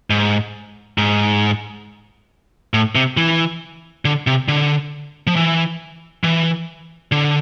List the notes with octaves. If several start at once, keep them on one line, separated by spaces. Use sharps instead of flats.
G#2
G#2
A2
C3
E3
D3
C3
D3
F3
E3
E3
D3